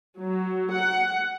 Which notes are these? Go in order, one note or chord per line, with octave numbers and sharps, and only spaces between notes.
F#3
F#5